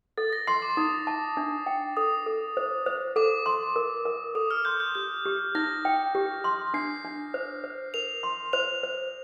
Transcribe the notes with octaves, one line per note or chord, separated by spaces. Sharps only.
A4 A6
A#6
C6 C7
D6
D#4 D#6
A5
D4
G5
A4 D#6
A4
C5
C5
A4 D6
C6
A#4
A#4
A4 D#6
F6
C6 G6
G6
G4 G6
G4
D#4 A#6
G5
G4
C6
D4 C7
D4
C5
C5
A#4 F7
C6
C5 F7
C5